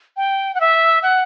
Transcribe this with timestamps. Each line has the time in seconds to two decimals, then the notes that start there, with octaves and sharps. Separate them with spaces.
0.17 G5
0.55 F#5
0.60 E5
1.03 F#5